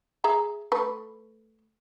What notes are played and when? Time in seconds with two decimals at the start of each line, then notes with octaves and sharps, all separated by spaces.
0.24 G#4 E5 A#5
0.72 A3 B4